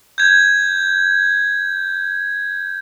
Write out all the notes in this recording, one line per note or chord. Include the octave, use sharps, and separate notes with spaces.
G6 G#6